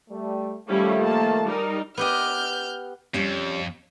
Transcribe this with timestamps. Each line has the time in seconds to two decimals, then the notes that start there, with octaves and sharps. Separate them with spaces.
0.10 G3 A3
0.69 D#3 F3 G3 A3 C#4 E4
1.00 A#3 A5
1.44 G3 D#4 A#4
1.97 B3 G4 D#5 F6 G6
3.14 F2 G3 C#4